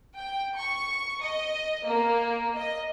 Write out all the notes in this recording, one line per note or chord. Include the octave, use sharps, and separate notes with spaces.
G5
C#6
D#5
A#3
D#5